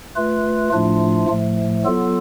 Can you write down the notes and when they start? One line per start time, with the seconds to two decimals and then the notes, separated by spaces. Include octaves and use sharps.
0.15 A3 F4 B4
0.72 A2 F3 A3 D4 F4
1.28 A2 F3 A3
1.84 F#3 B3 F4 A4